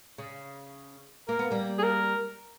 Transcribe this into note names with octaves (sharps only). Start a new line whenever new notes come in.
C#3
A#3 A#4
B3
G3 A#3
G#4
A#4